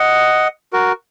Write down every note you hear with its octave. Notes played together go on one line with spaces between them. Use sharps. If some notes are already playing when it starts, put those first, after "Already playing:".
Already playing: D#5 F#5
F#4 A#4